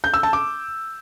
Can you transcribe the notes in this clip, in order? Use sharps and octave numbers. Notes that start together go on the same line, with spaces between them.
G6
E6
A5
D6